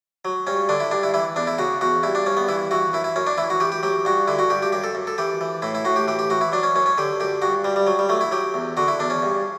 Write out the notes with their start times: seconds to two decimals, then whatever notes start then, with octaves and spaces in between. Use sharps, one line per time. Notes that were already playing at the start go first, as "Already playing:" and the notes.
0.25 F#3
0.47 G2 C#4
0.69 D3 D4
0.80 E4
0.91 G2 D4
1.03 E4
1.14 E3 E4
1.36 E2 D4
1.47 E4
1.58 C#3 F#4
1.81 E2 F#4
2.03 G2 E4
2.15 D4
2.26 G2 C#4
2.37 B3
2.48 E3 E4
2.71 E3 F#4
2.93 F#2 E4
3.04 E4
3.16 F#2 C#4
3.27 D4
3.38 E3 E4
3.50 F#4
3.60 E3 G4
3.72 G4
3.83 F#3 G4
4.05 G2 F#4
4.28 D3 E4
4.39 F#4
4.50 G2 G4
4.62 G4
4.72 F#2 G4
4.84 A4
4.95 F#2
5.07 A4
5.18 E3 G4
5.41 E3
5.62 A2 E4
5.75 E4
5.85 A2 F#4
5.96 G4
6.08 E3 G4
6.19 G4
6.30 E3 F#4
6.41 E4
6.52 F#3 D4
6.63 C#4
6.75 F#2 C#4
6.86 C#4
6.98 D3 G4
7.20 F#2 G4
7.42 G2 F#4
7.64 G2 G3
7.76 G3
7.87 F#3
7.99 G3
8.09 F#3 A3
8.21 E4
8.31 F#3 G4
8.54 E2
8.77 D3 F#4
8.88 E4
8.99 E2 D4
9.10 C#4
9.22 G2